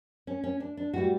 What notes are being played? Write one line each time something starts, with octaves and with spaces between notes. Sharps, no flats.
C#4
C#4
D4
D4
A2 E3 G3 F#4